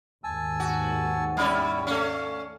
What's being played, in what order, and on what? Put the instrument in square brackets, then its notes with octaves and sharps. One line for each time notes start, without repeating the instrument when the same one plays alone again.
[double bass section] D#2 G#2 [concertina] G#5 A5 E6
[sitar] F#4
[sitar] G3 C#4 D5 [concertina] E4
[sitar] A3 C#4 [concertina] F5